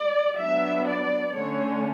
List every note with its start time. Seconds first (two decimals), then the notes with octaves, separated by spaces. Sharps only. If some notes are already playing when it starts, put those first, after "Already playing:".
Already playing: D5
0.38 F#3 B3 D4 E5
0.86 D5
1.34 D3 A3 C#4 C#5